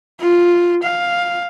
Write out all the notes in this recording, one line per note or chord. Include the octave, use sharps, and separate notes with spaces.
F4
F5